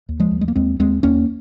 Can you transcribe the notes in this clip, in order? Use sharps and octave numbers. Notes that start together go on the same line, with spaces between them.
D#2
F3 G#3
D#2
G#3
A#3
D#2 G#3 C4
D#2 G#3 C4
D#2 A#3 C#4